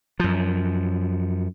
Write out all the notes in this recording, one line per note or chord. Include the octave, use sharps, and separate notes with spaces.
F#2 F3